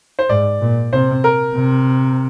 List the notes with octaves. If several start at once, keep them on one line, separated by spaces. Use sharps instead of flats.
C5
G#2 D5
A#2
C3 C5
A#4
C3